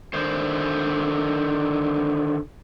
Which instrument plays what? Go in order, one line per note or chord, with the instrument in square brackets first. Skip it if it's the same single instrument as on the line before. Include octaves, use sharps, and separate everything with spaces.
[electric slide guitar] D3 D#3 C5